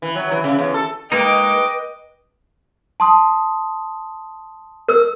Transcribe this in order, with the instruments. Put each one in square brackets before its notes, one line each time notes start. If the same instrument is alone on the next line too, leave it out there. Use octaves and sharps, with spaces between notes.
[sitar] E3
F#3
E3
C#3
E2
A4
[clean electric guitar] G#3 A#3 D#4 [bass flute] B4 [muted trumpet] D#5 [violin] G5 D6
[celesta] A5 C6 D#6
[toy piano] A#4 E6